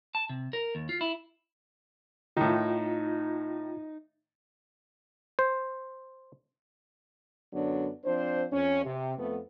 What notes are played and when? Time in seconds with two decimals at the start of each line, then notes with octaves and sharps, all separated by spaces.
0.15 A5
0.30 C3
0.53 A#4
0.75 D#2
0.89 F4
1.01 E4
2.37 A2 D#3 D#4 F4
5.39 C5
7.53 F#2 D3 F#3 B3 D4
8.05 F3 C4 D4 C5
8.52 F2 C#4
8.85 C3
9.18 F2 A3 B3